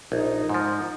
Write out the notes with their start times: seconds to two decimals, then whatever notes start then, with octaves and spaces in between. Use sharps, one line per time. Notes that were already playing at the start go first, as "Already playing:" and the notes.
0.12 A#1 D#4
0.49 G#2 F3